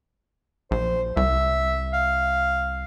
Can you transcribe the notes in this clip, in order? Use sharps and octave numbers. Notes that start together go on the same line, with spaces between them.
A#1 C5
C2 E5
F5